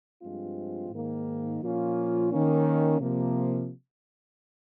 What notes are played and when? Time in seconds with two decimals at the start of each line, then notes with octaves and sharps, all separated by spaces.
0.21 G2 F3 G#3 C4 F4
0.90 G#2 D#3 A#3
1.61 A#2 F3 A#3 C#4 F4
2.31 D#3 A#3 C#4
3.00 C3 F3 A#3